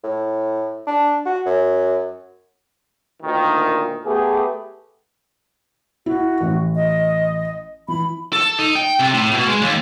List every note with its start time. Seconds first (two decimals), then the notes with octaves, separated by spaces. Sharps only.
0.04 A2
0.87 D4
1.26 F#4
1.46 F#2
3.22 D2 A#2 D#3
4.05 A3 B3 G4 G#4
6.06 E4 F#4
6.41 A1
6.75 D#5
7.88 E3 B5
8.33 A4
8.59 D#4
8.75 G5
9.00 C3
9.13 A2
9.33 B2
9.47 G#3
9.62 D#2